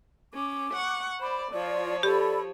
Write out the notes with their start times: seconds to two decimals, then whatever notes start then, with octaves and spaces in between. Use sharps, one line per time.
0.34 C#4 D6
0.74 F#5 C#6
1.20 C5 D5 B5
1.52 F3 F4 C#5 D5
2.03 G4 A4 D5 B5